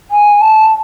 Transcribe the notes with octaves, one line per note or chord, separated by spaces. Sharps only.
G#5
A5